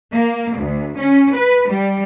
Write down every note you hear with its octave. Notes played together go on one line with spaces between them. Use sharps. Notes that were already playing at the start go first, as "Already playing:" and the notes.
A#3
D2
C#4
B4
G3